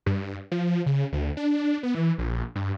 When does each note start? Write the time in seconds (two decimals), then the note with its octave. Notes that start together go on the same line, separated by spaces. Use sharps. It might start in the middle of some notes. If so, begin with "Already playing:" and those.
0.06 G2
0.52 F3
0.86 C#3
1.12 D2
1.37 D4
1.83 B3
1.95 E3
2.18 A#1
2.55 G2